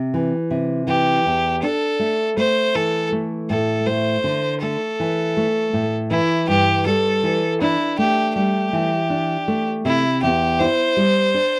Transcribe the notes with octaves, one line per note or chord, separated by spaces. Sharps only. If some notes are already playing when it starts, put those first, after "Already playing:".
Already playing: C3
E3
C3
E3 G4
E2
D4 A4
A3
A3 C5
E3 A4
A3
A2 A4
A3 C5
D3
A3 A4
E3
A3
A2
E3 E4
G2 G4
G3 A4
E3
D4 E4
A3 G4
G3 G4
E3
D4
A3
C3 E4
E2 G4
E4 C5
G3
D4